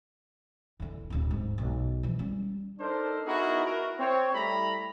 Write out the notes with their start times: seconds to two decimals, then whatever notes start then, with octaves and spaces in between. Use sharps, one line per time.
0.80 E2 D3
1.10 D1 C#3
1.31 G#2
1.58 B1
2.03 E3 F3
2.19 G3 C#4
2.80 D4 D#4 A4 A#4 C5
3.26 B3 D#4 E4 F#4 G#4 A#4
3.65 E4 F#4 A#4
3.99 C4 C#5
4.34 G3 A3 E4 A#5 B5